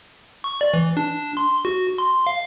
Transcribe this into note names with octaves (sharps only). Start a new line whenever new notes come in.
C#6
D5
E3
D4
C6
F#4
C6
F5